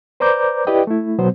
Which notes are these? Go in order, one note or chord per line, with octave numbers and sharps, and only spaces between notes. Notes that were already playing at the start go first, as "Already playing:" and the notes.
B4 C5 D5 A#5 D6 G6
E4 G4 B4 D5 D#5 G5
A3 E4
B2 F#3 B3 C5